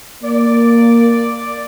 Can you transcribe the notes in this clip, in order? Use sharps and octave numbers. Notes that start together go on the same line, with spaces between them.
A#3 D5